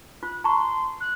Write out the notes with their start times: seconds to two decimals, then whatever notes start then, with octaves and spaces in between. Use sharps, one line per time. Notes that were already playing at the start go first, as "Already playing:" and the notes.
0.23 F4 F#6
0.44 A5 A#5 C6 C#6
1.01 F#6